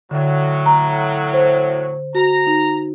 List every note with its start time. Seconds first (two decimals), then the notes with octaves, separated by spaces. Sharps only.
0.11 A2 D3 F#3
0.66 A#5
1.33 C5
2.15 F#4 A#5
2.47 D#4